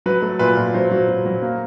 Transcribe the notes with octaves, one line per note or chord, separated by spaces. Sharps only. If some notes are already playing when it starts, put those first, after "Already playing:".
F#3 B4
A3
A#2 B4
A#2
F#3 C5
F#3
F#3
F#3
A#3